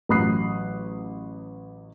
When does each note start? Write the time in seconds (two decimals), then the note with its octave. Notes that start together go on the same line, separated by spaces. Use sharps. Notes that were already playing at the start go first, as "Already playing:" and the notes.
0.09 A1 F#3 B5 D#6 F#6 C7